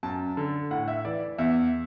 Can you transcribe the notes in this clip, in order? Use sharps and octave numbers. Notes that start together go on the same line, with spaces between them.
F#2 A5
D3
A2 F#5
E5
E3 D5
E2 E5